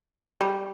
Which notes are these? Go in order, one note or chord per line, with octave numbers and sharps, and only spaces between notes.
G3